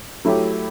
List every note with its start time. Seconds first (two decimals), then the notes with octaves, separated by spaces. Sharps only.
0.25 F#3 A3 E4 G4